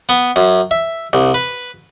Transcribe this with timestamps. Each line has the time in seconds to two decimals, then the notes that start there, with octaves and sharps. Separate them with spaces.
0.09 B3
0.36 F#2
0.71 E5
1.13 C2
1.34 B4